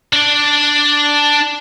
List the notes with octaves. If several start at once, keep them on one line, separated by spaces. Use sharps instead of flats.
D4 D5